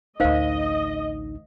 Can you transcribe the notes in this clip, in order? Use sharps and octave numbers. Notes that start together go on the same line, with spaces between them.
A1 D2 D#4 A#4 C5 D#5 F5